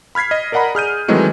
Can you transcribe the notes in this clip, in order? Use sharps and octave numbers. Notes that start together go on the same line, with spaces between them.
B5 F6 G#6 B6 C7
D#5
A#4 D5 D#5 F#5 A#5 B5
G#4 F6 G6 D#7
D#3 E3 F#3 G#3 A3 C4